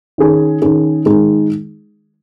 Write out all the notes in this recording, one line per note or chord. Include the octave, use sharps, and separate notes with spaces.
D#3 C#4 G#4
D#3 C#4 G#4
D#3 G#3 D#4 G#4